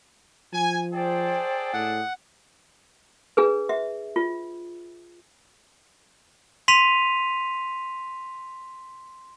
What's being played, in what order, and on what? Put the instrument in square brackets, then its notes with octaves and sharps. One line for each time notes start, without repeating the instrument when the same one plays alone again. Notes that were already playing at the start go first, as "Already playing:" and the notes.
[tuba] F3 [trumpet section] G#5
[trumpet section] G#4 A4 D5 [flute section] C5 G5
[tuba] A2 [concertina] F#5
[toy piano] D4 G#4 B4
E5
F4
[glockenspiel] C6 B6 D#7 F7